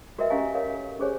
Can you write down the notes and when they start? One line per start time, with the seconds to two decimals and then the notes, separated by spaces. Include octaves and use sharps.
0.18 F#4 A#4 B4 D#5 E5 G5
0.30 C#4 G4 D#5 F5 G#5 A#5
0.55 A#4 C#5 F5
0.73 A4
0.99 C#4 G4 G#4 C5 C#5 G#5